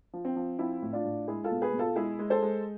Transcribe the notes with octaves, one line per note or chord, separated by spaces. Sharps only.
F3
C4
F3
F3 C4 E4
A2
D4 F4
A2
G#3 E4 G#4
F4 A4
B2
G#4 B4
B2
F4 A4
G#3 E4 G#4
G#3
A4 C5
G#3